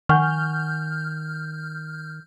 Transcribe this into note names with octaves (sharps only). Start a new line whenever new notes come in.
D#3 F#5 G#5 C#6 F6 G6